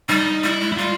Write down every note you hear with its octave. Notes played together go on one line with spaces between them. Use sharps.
G3 D#4
G3 E4
G#3
E4
G3 F4